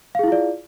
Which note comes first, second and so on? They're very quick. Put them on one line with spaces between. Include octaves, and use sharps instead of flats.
F5 G#4 E4 F4 D5